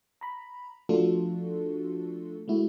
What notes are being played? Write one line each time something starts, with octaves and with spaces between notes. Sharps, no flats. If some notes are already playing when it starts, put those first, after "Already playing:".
A#5 B5
F3 A3 D4 F4 F#4 A4
G#3 A3 E4 F#4